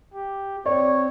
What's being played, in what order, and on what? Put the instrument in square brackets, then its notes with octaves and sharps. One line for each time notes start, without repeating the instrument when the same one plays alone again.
[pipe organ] G4
[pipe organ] C4 [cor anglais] C#5 [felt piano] D5